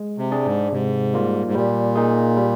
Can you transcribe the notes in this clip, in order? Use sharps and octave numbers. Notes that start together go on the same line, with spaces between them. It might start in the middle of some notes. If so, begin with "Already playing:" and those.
Already playing: G#3
C3
D4 G#4 D5
G#2
G#2 C3
G3 A#3 F4
G#2
A#2 G3
A#3 D#4 G#4
G3